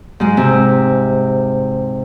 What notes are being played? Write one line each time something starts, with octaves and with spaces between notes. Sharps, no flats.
G#2 G#3
C3